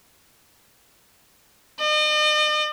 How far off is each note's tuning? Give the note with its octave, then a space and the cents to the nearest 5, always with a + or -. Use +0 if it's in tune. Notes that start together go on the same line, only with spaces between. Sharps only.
D#5 -45